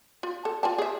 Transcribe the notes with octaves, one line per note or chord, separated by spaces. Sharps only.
F4
A4
F4 G#5 A5
G#4 E5